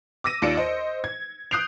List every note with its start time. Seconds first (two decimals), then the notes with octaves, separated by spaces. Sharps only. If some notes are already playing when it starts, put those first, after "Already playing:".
0.24 D6 E6 A#6 D#7
0.42 D#2 F4 D5 C#7 D7 E7
0.57 C5 D#5
1.04 G#6
1.51 D#6 F#6 G6 C7 D7 F7